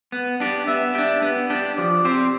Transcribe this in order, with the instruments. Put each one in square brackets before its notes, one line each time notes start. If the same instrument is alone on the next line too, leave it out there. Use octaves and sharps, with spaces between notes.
[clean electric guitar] B3
D4 G4
[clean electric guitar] B3 [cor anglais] E5
[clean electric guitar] D4 G4
B3
D4 G4
[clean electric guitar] F3 [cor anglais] D5
[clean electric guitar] C4 G4 C5